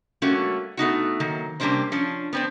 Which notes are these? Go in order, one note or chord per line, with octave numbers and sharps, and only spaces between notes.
G3 A3 A#3 C#4 F#4
A3 B3 D#4 F#4
D#3 F#3 A#3
C3 G3 A#3 C#4 D4 C5
F3 C#4 D4
B3 C4 D4